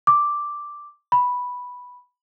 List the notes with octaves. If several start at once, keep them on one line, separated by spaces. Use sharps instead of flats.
D6
B5